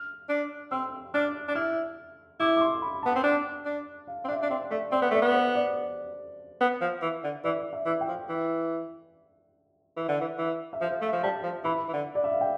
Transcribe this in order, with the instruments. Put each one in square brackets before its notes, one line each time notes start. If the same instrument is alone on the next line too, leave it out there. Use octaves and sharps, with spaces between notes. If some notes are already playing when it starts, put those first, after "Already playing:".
Already playing: [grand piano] F6
[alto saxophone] D4
[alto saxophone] C4 [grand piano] E6
[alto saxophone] D4 [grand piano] F6
[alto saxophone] D4
[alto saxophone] E4 [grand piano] F6
[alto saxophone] E4 [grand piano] D6
[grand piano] D6
C6
B5
[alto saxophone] B3 [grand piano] A5
[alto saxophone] C4
D4
D4
[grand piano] F5
[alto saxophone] C4
[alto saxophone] D4 [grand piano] E5
[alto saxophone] D4
[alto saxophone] C4 [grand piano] D5
[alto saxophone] A3 [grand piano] D5
[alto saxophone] C4 [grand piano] D5
[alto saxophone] B3
[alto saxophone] A3 [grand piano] D5
[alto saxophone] B3
[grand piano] C5
D5
[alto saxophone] B3
F3
E3
D3
[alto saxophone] E3 [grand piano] D5
[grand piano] E5
[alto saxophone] E3
[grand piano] G5
[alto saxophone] F3
E3
E3
D3
E3
E3
[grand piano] E5
[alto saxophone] F3 [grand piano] F5
[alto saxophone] A3
F3
[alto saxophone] G3 [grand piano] A5
[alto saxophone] F3
[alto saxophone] E3 [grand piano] B5
[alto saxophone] E3
D3
[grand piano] D5
E5
F5
G5